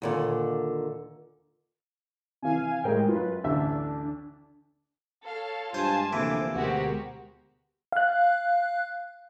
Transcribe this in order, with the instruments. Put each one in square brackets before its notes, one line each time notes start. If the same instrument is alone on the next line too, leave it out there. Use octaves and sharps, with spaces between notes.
[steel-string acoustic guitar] D#2 A#2 D3
[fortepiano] C3 E3 [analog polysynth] F5 G#5
[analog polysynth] A2 G3 G#3 [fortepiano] G#4 A#4 G5
[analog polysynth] F#2 B4 [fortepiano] F4
[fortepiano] A1 D2 E5 [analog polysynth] D4
[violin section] A4 F5 A5 [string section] C#5
[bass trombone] G2 [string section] G#3 G#5 A5 [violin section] F4 [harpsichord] C5
[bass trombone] D2 [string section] C3 F3 A#3 [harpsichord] E3 [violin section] D6
[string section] D2 G#3 A#4 [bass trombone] B2 [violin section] F#4 G4 C5
[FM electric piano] F5 F#6